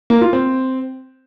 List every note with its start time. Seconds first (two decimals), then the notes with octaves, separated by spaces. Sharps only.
0.10 A#3
0.21 F4
0.33 C4